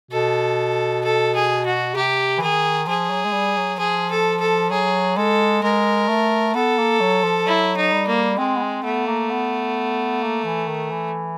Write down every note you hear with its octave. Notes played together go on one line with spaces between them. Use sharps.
B2 A4
A4
G#4
F#4
C3 G4
E3
D#3 G#4
F3 G#4
F#3
G#3
G3
F#3
F3 G#4
A4
A4
F#3 G#4
G#3 A4
G#3 A#4
A3
B3 A4
A#3
F#3
F3
F#3 E4
D#4
G3
A#3
G#3 C4
B3
C4
A3 B3
A#3
B3
A#3
E3
D#3
E3